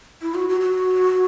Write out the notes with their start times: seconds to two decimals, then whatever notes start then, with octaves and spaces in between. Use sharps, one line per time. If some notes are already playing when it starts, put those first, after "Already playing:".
0.22 E4
0.35 F#4
0.49 F#4
0.61 F#4